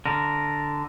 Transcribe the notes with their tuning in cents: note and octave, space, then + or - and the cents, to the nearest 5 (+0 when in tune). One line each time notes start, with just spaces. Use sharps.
D3 +0 A#4 +0